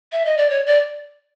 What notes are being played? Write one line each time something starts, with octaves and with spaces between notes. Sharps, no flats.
E5
D#5
D5
C#5
D5